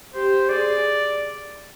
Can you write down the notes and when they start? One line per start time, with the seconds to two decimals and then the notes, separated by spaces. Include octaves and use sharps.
0.14 G4 C5
0.49 G#4 D5